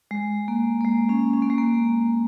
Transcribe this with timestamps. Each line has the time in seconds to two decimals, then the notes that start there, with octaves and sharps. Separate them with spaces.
0.11 G#3
0.48 A#3
0.81 A#3
0.85 G#3
1.09 C#4
1.33 C#4
1.42 A#3
1.50 G#3
1.58 A#3